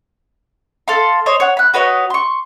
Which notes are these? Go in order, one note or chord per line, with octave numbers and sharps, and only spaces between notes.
A4 F5 C6
C5 C#5 D#5
C#5 F#5
B5 F#6
F#4 B4 C#5 D#5
C6 C#6